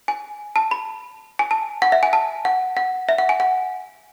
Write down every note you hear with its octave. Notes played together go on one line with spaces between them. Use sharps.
G#5
A5
B5
G#5
A5
F#5
E5
G#5
A5
F#5
F#5
E5
F#5
G#5
F#5